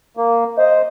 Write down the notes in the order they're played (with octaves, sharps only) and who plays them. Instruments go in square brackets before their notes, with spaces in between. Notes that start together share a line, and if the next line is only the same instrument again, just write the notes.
[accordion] A#3
[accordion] C5 [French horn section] D#5